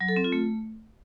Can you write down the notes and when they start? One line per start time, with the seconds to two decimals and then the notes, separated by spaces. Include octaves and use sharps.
0.01 F#3
0.08 A4
0.16 C4
0.24 F4
0.32 A3